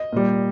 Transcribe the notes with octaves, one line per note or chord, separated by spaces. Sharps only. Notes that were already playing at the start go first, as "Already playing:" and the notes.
Already playing: D#5
A#2 G3